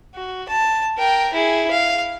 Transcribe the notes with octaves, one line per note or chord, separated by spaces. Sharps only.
F#4
A5
A#4 G5
E4 G#4
F5